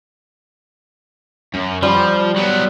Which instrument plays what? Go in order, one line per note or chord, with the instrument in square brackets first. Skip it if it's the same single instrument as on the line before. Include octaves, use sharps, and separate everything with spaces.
[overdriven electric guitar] F#2
[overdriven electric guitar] F3 [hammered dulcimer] G3
[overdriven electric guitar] F#3 B3